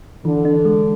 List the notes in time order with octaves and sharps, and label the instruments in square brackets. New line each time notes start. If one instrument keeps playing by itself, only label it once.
[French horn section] D3 [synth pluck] E3
[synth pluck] D4
G#3